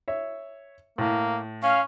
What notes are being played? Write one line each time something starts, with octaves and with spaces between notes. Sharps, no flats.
C#5 E5
A2 A#3
C#4 F5